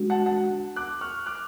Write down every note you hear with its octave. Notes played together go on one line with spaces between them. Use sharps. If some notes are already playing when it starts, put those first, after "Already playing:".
Already playing: G#3 D4 F#4
F#5 A5
F#5 A5
D6 F#6
C#6 F6
D6 F#6